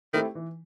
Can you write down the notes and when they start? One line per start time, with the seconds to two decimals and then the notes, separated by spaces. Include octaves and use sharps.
0.13 D#3 A3 C4 E4 G4
0.35 E3